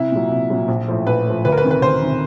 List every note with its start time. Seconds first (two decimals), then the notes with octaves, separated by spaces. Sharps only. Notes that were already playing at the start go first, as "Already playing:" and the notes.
Already playing: C2 E4
0.12 A#2 F#3
0.31 C2
0.50 A#2 F#3
0.68 A#1
0.88 A2 F3
1.07 A#1 B4
1.26 A2 F3
1.45 D2 B4
1.52 A#4
1.58 B4
1.63 C3 D#3
1.71 B4
1.82 D2 C5
2.03 C3 D#3